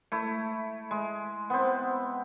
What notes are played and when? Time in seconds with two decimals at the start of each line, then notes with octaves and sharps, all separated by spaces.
0.12 A3 E4
0.91 G#3
1.50 B3 C4